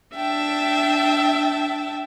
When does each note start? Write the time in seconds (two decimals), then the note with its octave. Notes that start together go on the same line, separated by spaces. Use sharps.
0.14 D4 E5 G5 A5